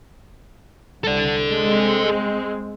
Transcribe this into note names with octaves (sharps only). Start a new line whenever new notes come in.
C2 A4 D5
G#3 C4